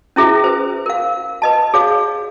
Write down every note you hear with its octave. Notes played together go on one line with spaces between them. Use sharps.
C#4 E4 G#4 E5
B4 C5
A#4 F5
B4 D#5 A5
G#4 C#5 F5